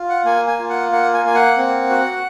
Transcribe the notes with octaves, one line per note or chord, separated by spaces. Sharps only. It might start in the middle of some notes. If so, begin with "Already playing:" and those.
Already playing: F4
F#5
A#3 G#5
G#5
F4
F#5
A#3 F#5
G#5
A#3 G#5
F#5
C4
F#4